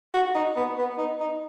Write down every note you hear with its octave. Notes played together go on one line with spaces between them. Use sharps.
F#4
D#4
B3
B3
D#4
D#4